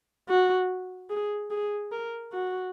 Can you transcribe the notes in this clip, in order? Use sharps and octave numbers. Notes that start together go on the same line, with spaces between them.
F#4
G#4
G#4
A#4
F#4